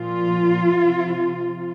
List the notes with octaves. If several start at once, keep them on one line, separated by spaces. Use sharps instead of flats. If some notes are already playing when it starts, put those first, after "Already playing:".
Already playing: A#2 F3 F4
C3 F3